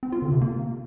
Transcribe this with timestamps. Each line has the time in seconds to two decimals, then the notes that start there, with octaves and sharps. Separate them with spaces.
0.03 C4
0.12 F4
0.22 D3
0.32 C3
0.41 A#3